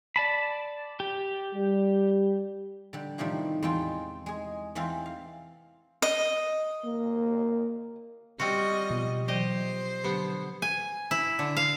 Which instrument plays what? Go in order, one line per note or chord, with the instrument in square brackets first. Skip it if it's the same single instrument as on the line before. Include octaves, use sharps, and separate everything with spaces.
[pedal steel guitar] D5 A5 B5
G4
[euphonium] G3
[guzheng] D3 G3
A2 C3 D#3 F3 G3 A3
E2 G#3 C4 F4 G5 A5
G#3 G#4
E2 E3 C4 F5 A5
F5
[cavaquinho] D#5
[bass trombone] A#3
[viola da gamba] G3 D#5 [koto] C4 F4 F#4
[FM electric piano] B2 F3
[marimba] E3 F#3 D5 [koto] G4 D#5 [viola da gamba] C5
[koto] D3 B3 [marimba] F#3 G4 B4
[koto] G#5
E4
D3
F5